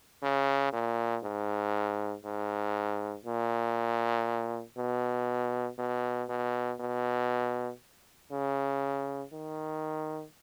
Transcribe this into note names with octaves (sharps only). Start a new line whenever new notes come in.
C#3
A#2
G#2
G#2
A#2
B2
B2
B2
B2
C#3
D#3